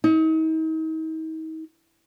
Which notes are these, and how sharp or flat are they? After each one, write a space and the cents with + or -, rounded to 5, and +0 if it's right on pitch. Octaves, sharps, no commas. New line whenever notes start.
D#4 +40